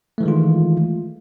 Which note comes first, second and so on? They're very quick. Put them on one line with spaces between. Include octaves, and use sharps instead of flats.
A3 E3 G#3 D#3 F4